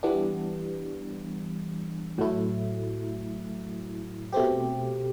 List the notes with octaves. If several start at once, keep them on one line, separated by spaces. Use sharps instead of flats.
E3 G3 B3 D4
A2 F#3 A3 E4
B2 A3 C4 G4